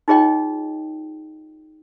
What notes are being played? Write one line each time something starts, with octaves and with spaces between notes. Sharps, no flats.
D#4 F4 G#4 C#5 D#5 G5